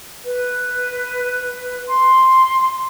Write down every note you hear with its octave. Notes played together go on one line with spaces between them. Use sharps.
B4
C6